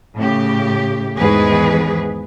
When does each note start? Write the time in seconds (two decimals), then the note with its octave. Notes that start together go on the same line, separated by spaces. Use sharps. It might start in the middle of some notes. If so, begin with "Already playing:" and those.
0.17 A2 C#3 G4
1.17 E2 G#2 D#3 G#4 B4